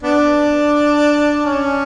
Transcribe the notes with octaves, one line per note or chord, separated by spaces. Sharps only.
B3 D4
C#4